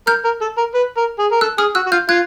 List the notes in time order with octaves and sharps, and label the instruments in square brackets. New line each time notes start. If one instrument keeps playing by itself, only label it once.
[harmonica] A#4 [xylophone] F6 G6
[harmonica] A#4
A4
A#4
B4
A#4
G#4
A#4
[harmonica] A4 [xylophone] E6 F#6
[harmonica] G#4 [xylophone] D#6 F6
[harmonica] F#4 [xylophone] E6 F#6
[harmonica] F#4
[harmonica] F4 [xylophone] F6 G6
[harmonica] F4 [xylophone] F#6 G#6